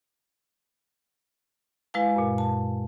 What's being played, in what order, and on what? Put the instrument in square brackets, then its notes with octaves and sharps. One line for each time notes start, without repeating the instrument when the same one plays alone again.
[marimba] G#3 E4 B4 F5 G#5
F#2 A#2
A5